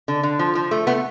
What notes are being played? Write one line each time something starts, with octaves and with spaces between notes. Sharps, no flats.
D3
D3
F3
F3
A3
A3 B3